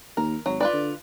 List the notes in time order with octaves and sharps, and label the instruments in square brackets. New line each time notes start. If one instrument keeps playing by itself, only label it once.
[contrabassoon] D#2 [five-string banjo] A#4
[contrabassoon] G#1 [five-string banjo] F#3
[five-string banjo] F4 B4 D5
[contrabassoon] D3